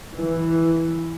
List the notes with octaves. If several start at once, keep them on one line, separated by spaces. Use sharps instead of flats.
E3